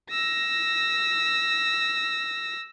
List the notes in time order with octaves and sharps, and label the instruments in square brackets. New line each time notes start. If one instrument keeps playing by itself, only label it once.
[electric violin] E6 A#6